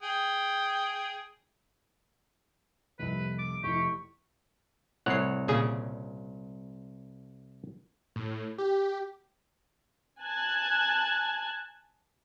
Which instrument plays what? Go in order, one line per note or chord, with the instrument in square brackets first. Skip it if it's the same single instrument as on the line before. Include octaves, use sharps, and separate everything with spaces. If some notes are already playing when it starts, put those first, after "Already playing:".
[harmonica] G#4 G5
[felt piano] F1 C2 [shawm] B4
[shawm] D6
[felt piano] F1 E4 [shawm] G4 [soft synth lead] C#6
[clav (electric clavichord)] C2 C#5 F#5 [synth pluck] A2 C7
[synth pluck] A#2 C#3 G#4
[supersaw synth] A2
G4
[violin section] G#5 A5 F#6 G#6